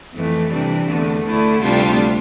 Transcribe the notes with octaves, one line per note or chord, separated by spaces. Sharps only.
F2 E3 A3
C3 E3 G3 D4
E2 D3 A3
D2 D3 A3 E4
D2 C3 G3 D4 F4